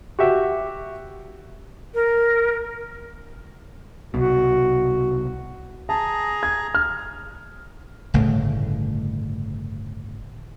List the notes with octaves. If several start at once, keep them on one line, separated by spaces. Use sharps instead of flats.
F#4 G4 E5
A#4
C2 B2 F#4
G#4 A5 A#5
G#6
F6
G1 A2 C#3 A3